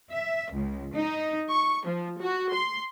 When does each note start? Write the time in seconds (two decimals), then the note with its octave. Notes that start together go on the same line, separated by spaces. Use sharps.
0.12 E5
0.52 C#2
0.95 D#4
1.49 C#6
1.85 F3
2.19 F#4
2.52 C6